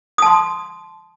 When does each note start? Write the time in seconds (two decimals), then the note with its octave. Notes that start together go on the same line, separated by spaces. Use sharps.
0.18 D#6
0.22 A5
0.26 C6